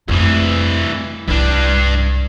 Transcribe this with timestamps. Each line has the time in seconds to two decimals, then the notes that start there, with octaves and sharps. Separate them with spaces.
0.08 C2 F2 E3 A3
1.28 C2 G2 D4 E4